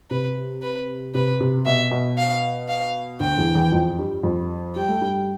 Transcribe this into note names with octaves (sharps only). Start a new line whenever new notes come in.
C3 B4
B4
C3 B4
C3
B2 E5
B2
F5
F5
D2 D3 G5
E2 E3
E2 E3
F2 F3
G2 G3
F2 F3
G3 G5
A3
G2 G3